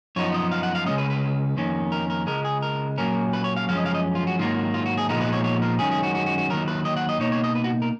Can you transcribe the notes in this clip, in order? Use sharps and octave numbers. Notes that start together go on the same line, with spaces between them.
F#2 F3 B3 D#4 C#5
D#5
F5
F#5
F5
C#3 G#3 C#4 D#5
B4
B4
F2 D#3 A#3 C#4
A#4
A#4
C#2 C#3 G#3 A#4
G#4
A#4
A#2 F#3 A#3 C#4 A#4
B4
C#5
F5
F#2 F3 G#3 C#4 F5
D#5
F5
D#5
F4
F#4
G#2 D#3 F#3 A#3 F4
F4
F#4
G#4
A#2 F3 G#3 B3 D#4 A#4
B4
C#5
C#5
A#4
F#2 D#3 G#3 C#4 G#4
G#4
F#4
F#4
F#4
F#4
D#2 D#3 F#3 A#4
B4
D#5
F#5
D#5
B2 A#3 D#4 C#5
C#5
D#5
B4
F#4
A#4